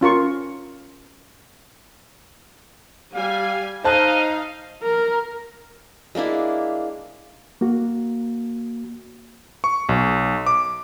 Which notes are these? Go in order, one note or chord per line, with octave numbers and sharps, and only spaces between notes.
C#4 F4 A#4 C#6
G3 F5 G#5
D#4 C5 D#5 F5 A5 F#6
A#4
G#3 A#3 D4 E4
A#3 F#4
C#6
B1
D6